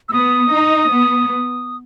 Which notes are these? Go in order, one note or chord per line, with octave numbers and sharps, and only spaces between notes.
E6
B3 D#6
D#4
B3